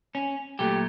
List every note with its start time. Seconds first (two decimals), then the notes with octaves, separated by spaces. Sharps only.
0.15 C#4
0.59 A#2 F#3 A3 G4